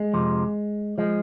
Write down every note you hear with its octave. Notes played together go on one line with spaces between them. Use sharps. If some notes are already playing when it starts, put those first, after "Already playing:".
Already playing: G#3
F2 C3 F3
F3 G#3